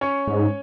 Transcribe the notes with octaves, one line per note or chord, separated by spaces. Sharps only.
C#4 C#5
G#2